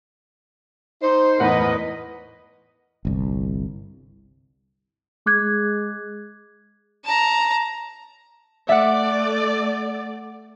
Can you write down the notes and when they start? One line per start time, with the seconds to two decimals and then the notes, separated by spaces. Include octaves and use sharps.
1.02 D#4 C5
1.40 E2 A2 A#4 B4 D#5 F#5
3.05 G1 C2
5.26 G#3 D6 F#6 G#6
7.04 A5 A#5
8.69 A3 D5 E5 F#5